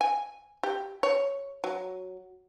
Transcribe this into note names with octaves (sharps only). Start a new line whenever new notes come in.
G#5
G4
C#5
F#3